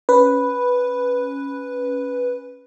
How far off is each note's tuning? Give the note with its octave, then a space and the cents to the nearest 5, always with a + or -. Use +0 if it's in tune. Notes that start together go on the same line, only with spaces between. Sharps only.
C#4 +0 B4 +0